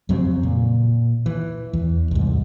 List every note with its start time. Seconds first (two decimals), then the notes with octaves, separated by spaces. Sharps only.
0.09 F2 C#3 F#3 C4
0.43 A#2
1.26 E3
1.73 E2
2.11 C2 G#2